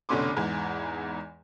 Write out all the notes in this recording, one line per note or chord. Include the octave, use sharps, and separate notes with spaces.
F1 B2 D3 C#4 C6 D6
E2 G#2 E3